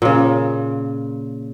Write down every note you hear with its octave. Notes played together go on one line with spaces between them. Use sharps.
A#2 C#3